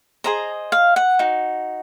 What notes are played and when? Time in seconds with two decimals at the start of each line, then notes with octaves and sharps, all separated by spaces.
0.24 G#4 C5 D#5 A#5
0.72 F5
0.96 F#5
1.19 D#4 F#4